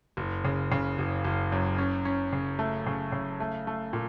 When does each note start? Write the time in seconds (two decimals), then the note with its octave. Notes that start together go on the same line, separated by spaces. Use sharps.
0.17 F#1
0.45 C#3
0.72 C#3
0.98 F#1
1.24 F#1
1.52 F#2
1.78 C#4
2.05 C#4
2.33 C#3
2.59 A3
2.87 C#3
3.12 C#3
3.40 A3
3.67 A3
3.93 A#2